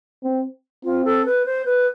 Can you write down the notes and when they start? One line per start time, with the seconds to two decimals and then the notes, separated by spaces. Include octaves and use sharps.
0.24 C4
0.84 C4 F4
1.05 A4
1.26 B4
1.46 C5
1.65 B4